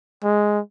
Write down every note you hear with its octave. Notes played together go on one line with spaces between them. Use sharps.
G#3